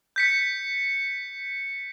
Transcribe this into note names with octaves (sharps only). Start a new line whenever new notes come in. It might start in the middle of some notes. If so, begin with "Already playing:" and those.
G6 B6 C#7